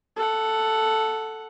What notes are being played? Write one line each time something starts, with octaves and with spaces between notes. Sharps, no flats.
A4 F#5